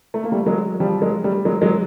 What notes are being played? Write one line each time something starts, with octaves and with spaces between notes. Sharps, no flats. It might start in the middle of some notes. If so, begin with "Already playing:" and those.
A3
A#3
G3 A3
F#3 G#3
F3 G3
F#3 G#3
G3 A3
F#3 G#3
F#3 G#3